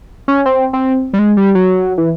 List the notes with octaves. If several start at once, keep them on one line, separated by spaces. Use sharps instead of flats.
C#4
C4
C4
G3
G#3
G3
F#3
E3